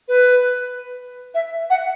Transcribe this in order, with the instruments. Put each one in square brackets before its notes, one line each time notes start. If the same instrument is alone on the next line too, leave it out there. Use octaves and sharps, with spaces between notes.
[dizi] B4
E5
F#5